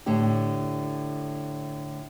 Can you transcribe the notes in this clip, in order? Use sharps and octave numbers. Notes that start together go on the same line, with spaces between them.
A2 D3 G4